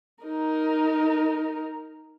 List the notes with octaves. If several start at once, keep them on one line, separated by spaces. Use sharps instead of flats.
D#4 A#4